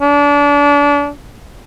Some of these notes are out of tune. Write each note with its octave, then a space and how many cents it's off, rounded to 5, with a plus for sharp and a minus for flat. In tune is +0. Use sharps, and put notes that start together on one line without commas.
D4 -30